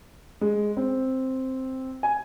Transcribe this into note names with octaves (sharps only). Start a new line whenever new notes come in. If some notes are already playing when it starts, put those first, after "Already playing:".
G#3
C4
G#5